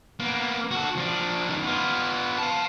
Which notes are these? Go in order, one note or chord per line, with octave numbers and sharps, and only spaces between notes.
A#3 B3
F#4 A4
F3 D4
F#2 D#3
B3 F4
F5 A5